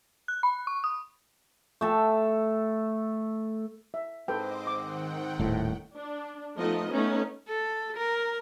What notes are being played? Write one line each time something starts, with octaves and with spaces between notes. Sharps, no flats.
F#6
B5
C#6
D#6
A3 A4 G5
E5
G#2 C4 A4 B4 C5 D#5 G5 D6
D#3 F#5 G5 D6
D#1 A2
D4
F3 A3 B3 D#4 D#5
A3 B3 C#4 D#4
A4
A#4